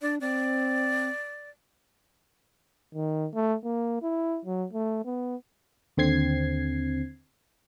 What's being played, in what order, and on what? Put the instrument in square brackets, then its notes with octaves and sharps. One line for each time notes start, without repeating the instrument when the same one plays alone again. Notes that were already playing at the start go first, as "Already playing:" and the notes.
[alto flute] D4 [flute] D5
[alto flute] C4 [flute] D5
[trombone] D#3
A3
A#3
E4
F#3
A3
B3
[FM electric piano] D#2 D3 C4 G#6 C7